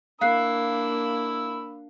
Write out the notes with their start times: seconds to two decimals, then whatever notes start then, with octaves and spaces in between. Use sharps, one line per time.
0.21 A#3 D4 F5 B5 E6 F#6 C7